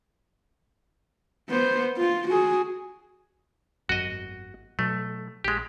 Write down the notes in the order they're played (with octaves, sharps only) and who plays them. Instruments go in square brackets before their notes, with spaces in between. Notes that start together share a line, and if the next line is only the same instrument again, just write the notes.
[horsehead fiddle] B3 C5
F4
F#4 G#4
[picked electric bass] G#1 F#2 [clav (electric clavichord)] F#4 D#5
[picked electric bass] B2 F#3 [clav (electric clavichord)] A3
[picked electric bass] A#1 [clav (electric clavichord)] G#3 G4